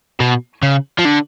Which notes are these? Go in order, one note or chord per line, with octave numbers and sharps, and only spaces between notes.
B2
C#3
F3
D3